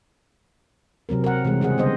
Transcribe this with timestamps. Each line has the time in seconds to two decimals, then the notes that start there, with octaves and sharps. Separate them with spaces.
1.09 C3 F#3 C4 A#4
1.24 A#4 F#5
1.45 C3 E3 G3 G#3
1.61 C#3 C4 G#4 F#5
1.78 D3 G3 B3 C5 D#5